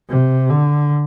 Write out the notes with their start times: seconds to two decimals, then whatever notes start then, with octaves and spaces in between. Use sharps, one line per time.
0.10 C3
0.50 D3